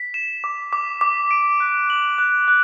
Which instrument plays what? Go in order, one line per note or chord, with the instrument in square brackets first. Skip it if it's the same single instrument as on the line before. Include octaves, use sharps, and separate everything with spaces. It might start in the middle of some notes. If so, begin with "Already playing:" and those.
Already playing: [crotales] B6
E7
D6
D6
D6
D7
F#6
F#7
F#6
F#6